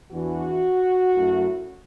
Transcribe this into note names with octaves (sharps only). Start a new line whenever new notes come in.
E2 E3 D4 F#4
F#2 F#3 A3 E4